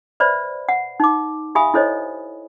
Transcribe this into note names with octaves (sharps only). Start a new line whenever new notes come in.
B4 C5 D5 E5 B5
F#5
D#4 D6
G4 E5 F5 G#5 B5 D#6
E4 A4 C5 C#5 D#5